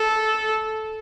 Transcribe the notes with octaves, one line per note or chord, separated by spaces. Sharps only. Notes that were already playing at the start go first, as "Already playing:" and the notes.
Already playing: A4